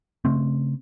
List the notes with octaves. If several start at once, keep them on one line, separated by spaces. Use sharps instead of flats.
C#3 A3 C4